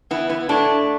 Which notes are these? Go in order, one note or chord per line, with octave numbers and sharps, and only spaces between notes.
E3 B3 E4
B3 E4
A2 A3 D4